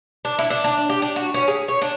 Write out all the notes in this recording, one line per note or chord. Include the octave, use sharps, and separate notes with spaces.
D4
E4
D4
D4
D4
G4
D4
F#4
C#4
G#4
C#5
D4